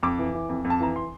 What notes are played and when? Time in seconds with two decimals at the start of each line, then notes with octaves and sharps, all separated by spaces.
0.03 F2 D6
0.18 E3
0.34 E3
0.49 F2
0.65 F2
0.70 A5
0.80 E3 A#5
0.96 C6